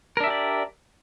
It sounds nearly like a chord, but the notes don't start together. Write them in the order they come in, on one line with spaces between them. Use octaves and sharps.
A#4 D4 E5 G4 D5